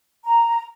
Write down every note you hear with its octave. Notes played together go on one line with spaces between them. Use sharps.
A#5